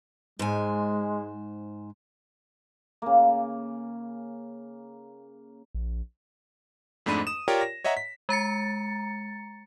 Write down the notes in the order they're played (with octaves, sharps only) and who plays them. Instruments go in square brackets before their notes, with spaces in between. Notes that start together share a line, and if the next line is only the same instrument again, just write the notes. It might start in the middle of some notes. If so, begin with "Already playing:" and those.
[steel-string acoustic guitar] G#2 C5 G#5 [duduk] G#3
[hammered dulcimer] C#3 A#3
[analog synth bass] A#1
[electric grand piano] F2 G#2 A3 D4 B5 D#7
D#6 E7
F4 G4 A#4 C#5 D5 G5
A#6
C#5 D#5 E5 F#5 A#5
B6
[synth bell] G#3 A#5 A6 C#7